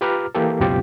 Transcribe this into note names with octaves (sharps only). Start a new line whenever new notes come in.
F4 G4 B4 A#5 D6 F6
E3 A#3 G4 A4
C#2 F#2 B2 C4 F4 G4